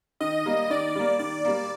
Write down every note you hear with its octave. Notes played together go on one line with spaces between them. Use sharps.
D#3 D#5
G3 A#3
D#3 D5
G3 A#3
D#3 D5
G3 A#3